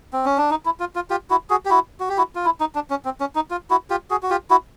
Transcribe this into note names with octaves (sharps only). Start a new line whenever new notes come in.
C4
C#4
D4
D#4
E4
F4
F4
F4 G4
E4 F#4
F#4 G#4
G4
E4 F#4
F#4
G4
E4 F#4
F4
E4
D#4
D4
C#4
C4
C#4
D#4
F4
E4 F#4
F4 G4
F#4 G#4
F#4
F4 G4
E4 F#4